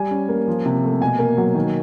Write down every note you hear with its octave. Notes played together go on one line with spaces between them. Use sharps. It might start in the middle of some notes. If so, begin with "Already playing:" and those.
Already playing: G3 G#5
C#4
A#3
F3
C3
A3
B2 G#5
A#3
F#3
D#3